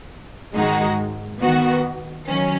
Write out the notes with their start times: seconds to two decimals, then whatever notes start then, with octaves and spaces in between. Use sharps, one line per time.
0.55 G#2 D#3 G#3 D#4 F#4
1.42 D#3 B3 F#4
2.27 D#3 F#3 C#4